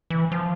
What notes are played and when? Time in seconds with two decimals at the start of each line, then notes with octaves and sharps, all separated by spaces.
0.10 E3
0.32 F3